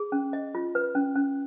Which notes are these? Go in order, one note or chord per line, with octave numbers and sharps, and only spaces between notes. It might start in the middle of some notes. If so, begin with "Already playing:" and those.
Already playing: G#4
C#4
D#5
F4
B4
C#4
C#4